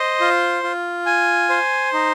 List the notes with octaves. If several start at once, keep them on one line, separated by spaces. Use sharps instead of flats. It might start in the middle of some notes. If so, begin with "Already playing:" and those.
Already playing: C5 D#5
F4
F4
G#5
C5
D#4